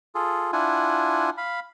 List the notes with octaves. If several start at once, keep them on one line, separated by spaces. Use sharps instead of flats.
F4 G#4 A4
D4 E4 F4 F#5 G#5
F5 B5